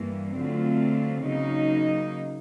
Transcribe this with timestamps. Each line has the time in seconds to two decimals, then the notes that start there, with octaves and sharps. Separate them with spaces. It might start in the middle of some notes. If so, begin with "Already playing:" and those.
Already playing: G2 E3 G3 A#3
0.36 D3 F#3 A3 C4 F4
1.23 C#3 F#3 A#3 D#4